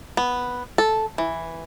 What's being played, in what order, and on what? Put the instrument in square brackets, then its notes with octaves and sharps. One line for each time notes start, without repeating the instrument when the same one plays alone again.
[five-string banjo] B3
A4
E3